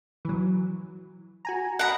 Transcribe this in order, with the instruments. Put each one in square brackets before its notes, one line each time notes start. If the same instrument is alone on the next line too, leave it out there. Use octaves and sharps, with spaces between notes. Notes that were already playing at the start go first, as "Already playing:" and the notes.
[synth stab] E3 F#3
F#4 G#5 A#5
[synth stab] D#5 B5 [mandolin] F#5 A#5